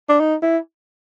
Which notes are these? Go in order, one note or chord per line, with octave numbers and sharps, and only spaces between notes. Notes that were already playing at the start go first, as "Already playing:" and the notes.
D4
D#4
E4